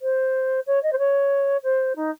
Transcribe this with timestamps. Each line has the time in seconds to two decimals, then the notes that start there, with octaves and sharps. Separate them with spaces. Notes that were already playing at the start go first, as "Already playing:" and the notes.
0.01 C5
0.67 C#5
0.83 D#5
0.92 C5
0.99 C#5
1.63 C5
1.96 D#4